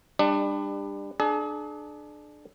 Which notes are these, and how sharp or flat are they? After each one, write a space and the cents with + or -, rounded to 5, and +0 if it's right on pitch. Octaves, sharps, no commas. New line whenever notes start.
G3 +30 D4 +25
D4 +25 G#4 +40